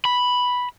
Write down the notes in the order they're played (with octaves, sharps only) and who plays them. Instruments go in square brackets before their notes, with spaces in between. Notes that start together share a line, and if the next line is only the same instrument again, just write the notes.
[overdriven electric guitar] B5